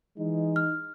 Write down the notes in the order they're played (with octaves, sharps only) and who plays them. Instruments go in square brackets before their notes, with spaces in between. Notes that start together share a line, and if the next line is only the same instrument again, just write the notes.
[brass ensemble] E3 G#3 [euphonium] D#4
[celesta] F6